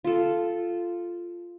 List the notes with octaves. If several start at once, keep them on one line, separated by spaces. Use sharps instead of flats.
F4 A4